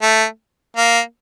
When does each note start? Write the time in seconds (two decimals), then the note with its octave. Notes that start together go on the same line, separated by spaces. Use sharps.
0.02 A3
0.77 A#3